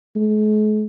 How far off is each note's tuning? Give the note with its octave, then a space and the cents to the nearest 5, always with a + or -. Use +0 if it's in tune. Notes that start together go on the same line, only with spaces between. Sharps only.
G#3 +45